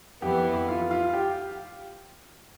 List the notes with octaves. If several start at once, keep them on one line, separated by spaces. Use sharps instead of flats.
F2 E3 B3 E4 G4
F4
F4
G4